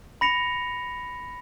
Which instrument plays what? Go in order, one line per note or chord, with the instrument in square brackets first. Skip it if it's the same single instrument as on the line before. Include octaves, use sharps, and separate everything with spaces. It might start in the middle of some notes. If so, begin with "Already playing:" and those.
[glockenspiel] B5 A#6 C#7 F7